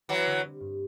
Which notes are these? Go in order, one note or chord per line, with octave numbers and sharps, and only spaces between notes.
E3 F#3 C4
D3
G3
G2